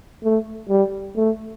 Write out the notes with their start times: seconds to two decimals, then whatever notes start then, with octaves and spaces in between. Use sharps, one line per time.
0.24 A3
0.69 G3
1.16 A3